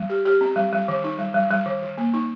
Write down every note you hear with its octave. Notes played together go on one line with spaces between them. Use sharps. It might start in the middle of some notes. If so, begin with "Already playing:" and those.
Already playing: G3
G4
G4
C4
G3
G3
D#3
D#4
G3
G3
G3
D#3
D#3
A#3
D#4